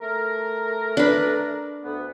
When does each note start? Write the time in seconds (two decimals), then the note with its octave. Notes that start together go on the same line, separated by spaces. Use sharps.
0.02 A3 A#4
0.97 D4 B4
1.84 D2 B3